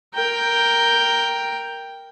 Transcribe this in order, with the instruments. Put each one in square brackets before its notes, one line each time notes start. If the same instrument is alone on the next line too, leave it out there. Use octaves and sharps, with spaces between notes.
[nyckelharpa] A#4 G5